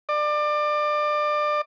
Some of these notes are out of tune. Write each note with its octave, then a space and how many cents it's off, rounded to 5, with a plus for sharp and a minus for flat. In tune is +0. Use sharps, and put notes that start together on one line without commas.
D5 +25